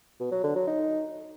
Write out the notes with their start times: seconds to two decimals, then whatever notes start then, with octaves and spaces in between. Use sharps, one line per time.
0.20 B2
0.32 F#3
0.44 D3
0.56 F#3
0.67 D#4